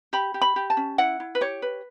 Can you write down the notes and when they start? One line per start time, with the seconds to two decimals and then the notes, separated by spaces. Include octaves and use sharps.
0.13 G4 B5
0.34 G4
0.41 B5
0.56 G4
0.70 A5
0.77 C#4
0.98 E4 F#5
1.20 E4
1.35 B4
1.41 G4 C#5
1.62 B4